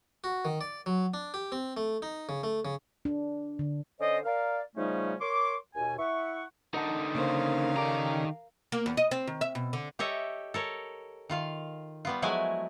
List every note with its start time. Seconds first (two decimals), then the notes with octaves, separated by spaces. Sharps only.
0.24 F#4
0.45 D#3
0.61 D5
0.86 F#3
1.14 D4
1.34 G4
1.52 C4
1.77 A3
2.02 D#4
2.29 C#3
2.43 A3
2.65 C#3
3.05 D4
3.59 D3
4.00 D3 C#4 C5 D5 D#5
4.25 A#4 D5 F5
4.76 C#3 F3 G3 A3 C#4 D#4
5.20 A#4 C#5 C6 D6
5.75 D#2 B2 G#5
5.99 E4 E5 F#5 C#6
6.74 D3 D#4 A#4 F#5 A5
7.15 C#3 A#3 A#4 C5 F5
7.77 D#3 G4 A4 D5 A#5
8.72 A#3
8.86 E2
8.97 D#5
9.11 C4
9.27 D#3
9.41 E5
9.55 B2
9.73 D3
9.99 G4 A4 C#5 D#5 E5
10.54 A4 A#4 C#5
11.29 D#3 F4 F5
12.05 G3 B3 F4
12.22 F3 F#3 G#3 A3 E4 G#5